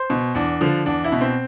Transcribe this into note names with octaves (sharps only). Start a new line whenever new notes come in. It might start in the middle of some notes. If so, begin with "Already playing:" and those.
Already playing: C5
B2
E2 D4
D3 F3
E2 D4
E4
B2
C4